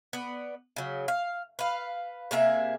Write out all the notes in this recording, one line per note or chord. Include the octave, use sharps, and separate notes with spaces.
B3 D5
C#3 F#3
F5
B4 F5
C3 A#3 G#4 E5